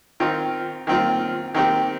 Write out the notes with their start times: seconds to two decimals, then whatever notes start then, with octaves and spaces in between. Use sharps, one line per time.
0.20 D#3 C4 F4
0.87 D#3 C4 F4
1.54 D#3 C4 G4